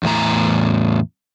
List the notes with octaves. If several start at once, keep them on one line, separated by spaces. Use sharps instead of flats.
E2 A2 A#5